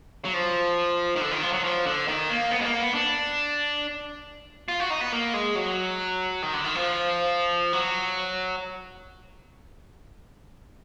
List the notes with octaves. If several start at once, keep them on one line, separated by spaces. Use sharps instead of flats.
F#3
F3
D#3
D3
D#3
F3
F#3
F3
D3
D#3
A#3
B3
G#3
A#3
B3
D4
F4
F#4
D#4
B3
A#3
G#3
F#3
D#3
D3
D#3
F3
F#3